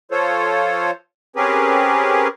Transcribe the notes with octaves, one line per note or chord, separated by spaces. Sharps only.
F3 F4 A4 C5 C#5
C4 C#4 G4 G#4 A#4 B4